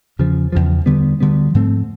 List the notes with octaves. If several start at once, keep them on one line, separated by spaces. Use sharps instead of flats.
E2 C#3 F3
E2 C#3 F3
D2 D3 G3 B3
D2 D3 G3 B3
G#2 F3 A3 C4